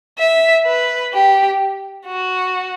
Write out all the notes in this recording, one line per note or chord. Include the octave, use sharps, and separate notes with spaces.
E5
B4
G4
F#4